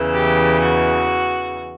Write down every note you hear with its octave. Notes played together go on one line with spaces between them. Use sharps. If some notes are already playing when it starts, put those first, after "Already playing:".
Already playing: E2 C#3 E3
G4
F#4